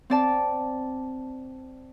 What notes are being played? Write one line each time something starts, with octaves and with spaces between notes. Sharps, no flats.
C4 D5 A5